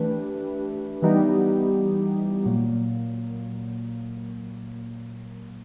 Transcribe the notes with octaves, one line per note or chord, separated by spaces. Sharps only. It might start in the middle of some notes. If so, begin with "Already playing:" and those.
Already playing: E3 A3 D4 G4 B4
E3 G3 B3 D#4 G4
A#2 F#3 A#3